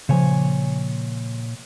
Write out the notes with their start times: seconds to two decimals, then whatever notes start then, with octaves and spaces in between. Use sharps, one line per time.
0.09 A#2 C#3 F3 C#5 G#5